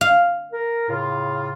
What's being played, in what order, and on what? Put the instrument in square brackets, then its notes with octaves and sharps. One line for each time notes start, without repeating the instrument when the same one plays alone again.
[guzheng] F5
[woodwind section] A#4
A2 C#3 F4